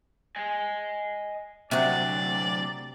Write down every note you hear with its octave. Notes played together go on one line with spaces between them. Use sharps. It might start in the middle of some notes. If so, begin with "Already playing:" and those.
D#5 G#5
D2 C3 F#3 F#4 D5